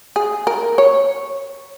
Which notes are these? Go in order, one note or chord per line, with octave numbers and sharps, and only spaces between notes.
G#4
A#4
C#5